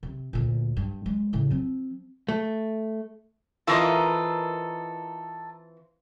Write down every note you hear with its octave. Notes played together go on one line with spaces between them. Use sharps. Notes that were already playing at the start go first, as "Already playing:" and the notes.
C3
D2 A#2
G2
G#3
A2 C#3
F3 C4
A3
E3 C4 F4 A4 A#4 D#5